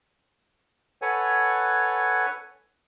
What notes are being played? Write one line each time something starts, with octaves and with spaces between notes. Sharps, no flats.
A4 B4 C#5 F#5 G#5